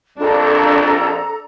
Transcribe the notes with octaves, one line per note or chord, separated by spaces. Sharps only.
A#1 F2 D4 A4 A#5